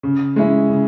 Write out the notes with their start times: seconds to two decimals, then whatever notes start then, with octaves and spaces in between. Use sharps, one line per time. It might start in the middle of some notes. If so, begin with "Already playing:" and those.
0.03 C#3
0.36 G#3 C#4 E4
0.70 C#3